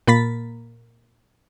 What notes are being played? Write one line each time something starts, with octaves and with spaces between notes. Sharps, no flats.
A#2 A#3 B5 A6 B6